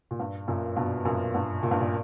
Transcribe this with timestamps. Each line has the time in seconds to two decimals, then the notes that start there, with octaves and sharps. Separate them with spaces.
0.11 A#2
0.19 G2
0.48 F#2 A#2
0.76 G2 B2
1.05 F#2 A#2
1.35 G2
1.63 A#2
1.71 G2
1.80 A#2